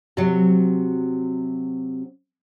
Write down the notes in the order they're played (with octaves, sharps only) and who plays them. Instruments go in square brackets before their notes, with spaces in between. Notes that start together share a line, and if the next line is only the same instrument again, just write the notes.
[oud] C3 F#3